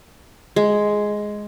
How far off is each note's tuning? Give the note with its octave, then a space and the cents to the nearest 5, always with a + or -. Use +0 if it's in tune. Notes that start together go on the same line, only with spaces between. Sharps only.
G#3 +5